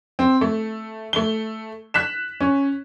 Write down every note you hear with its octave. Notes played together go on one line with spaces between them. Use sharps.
C4
A3
A3 G7
F#6 B6 E7
C#4